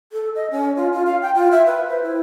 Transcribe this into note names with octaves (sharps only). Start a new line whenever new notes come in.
A4
D#5
C#4
F4
F4
F5
G5
F4
E5
B4
C5
E4